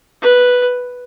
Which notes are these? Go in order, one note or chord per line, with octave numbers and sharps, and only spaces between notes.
B4